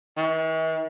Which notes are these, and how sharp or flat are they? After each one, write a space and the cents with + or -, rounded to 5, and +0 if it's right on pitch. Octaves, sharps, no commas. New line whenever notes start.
E3 -45